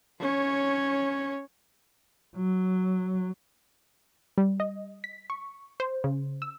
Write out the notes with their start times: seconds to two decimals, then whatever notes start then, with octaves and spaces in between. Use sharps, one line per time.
0.20 C#4 C#5
2.37 F#3
4.38 G3
4.60 D#5
5.04 B6
5.30 C#6
5.80 C5
6.04 C#3
6.42 E6